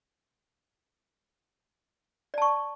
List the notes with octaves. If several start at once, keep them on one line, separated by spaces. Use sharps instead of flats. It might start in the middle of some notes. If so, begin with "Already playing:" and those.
D5 A5 C#6